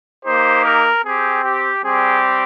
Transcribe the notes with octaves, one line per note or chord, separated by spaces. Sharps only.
A#3 D#4 G4 C5
A#4
C4 G4 G#4
G4
G3 C4 G4 G#4